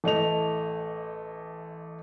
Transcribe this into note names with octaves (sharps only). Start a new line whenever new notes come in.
A1 A3 D#5 F7